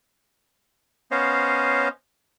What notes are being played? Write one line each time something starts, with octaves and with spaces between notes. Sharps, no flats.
B3 C#4 C5 C#5 D#5 F5